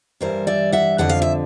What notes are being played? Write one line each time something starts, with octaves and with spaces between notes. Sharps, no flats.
G2 E3 G3 A#4 C5
D5 E5
E5 F#5
F2 D3 F3 F#5
F5
E5